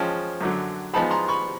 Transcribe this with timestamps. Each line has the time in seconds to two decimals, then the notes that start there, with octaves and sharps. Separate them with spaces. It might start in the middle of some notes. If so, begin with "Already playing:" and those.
Already playing: F3 G#3 C#4 G5 A5
0.41 F#2 D3 F#3
0.94 F3 G#3 B3 D#4 G#4 A5 B5
1.11 A#5 C6
1.29 B5 C#6